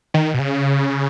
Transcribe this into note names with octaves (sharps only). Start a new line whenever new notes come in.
D#3
B2
C#3